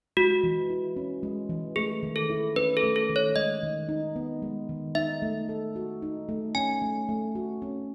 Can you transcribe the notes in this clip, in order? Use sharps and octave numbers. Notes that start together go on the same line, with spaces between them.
G#3 F#4
E3
E4
C#4
G#3
E3
A3 G#4
D#3
A4
E4
C#4 B4
A4
A3
A4
D#3
C#5
G#3 D#5
D#3
D#4
B3
G#3
D#3
D#4 E5
A3
A4
F#4
D#4
A3
C#4 G#5
A3
A3
F#4
C#4